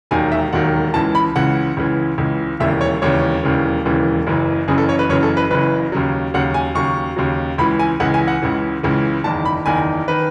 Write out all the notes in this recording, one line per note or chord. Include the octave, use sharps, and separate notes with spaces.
E1 D#2 D#3 F#3 G#5
E5
E1 D#2 D#3 F#3 F#5
C#2 C#3 E3 A5
B5
C#2 C#3 E3 F#5
C#2 C#3 E3
C#2 C#3 E3
E1 D#2 C#3 E3 E5
C#5
E1 D#2 C#3 E3 C#5
E1 D#2 C#3 E3
E1 D#2 C#3 E3
F#1 F#2 C#3 E3
F#1 F#2 C#3 E3 G#4
A4
C#5
B4
F#1 F#2 C#3 E3 C#5
A4
B4
F#1 F#2 C#3 E3 B4
D#2 C#3 F#3
D#2 C#3 F#3 F#5
G#5
D#2 C#3 F#3 C#6
D#2 C#3 F#3
C#2 C#3 E3 B5
G#5
C#2 C#3 E3 F#5
G#5
F#5
C#2 C#3 E3
C#2 C#3 E3
F#1 E2 D#3 A5
B5
F#1 E2 D#3 G#5
D#3 B4